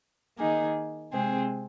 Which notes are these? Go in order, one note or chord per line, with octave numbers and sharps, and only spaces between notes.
D#3 A#3 D#4 G#4
C3 G#3 C4 G#4